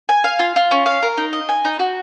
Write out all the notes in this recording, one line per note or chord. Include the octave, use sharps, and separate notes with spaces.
G#5
F5
F4
F4
C#4
F5
A#4
D#4
D#5
G#5
D#4
F#4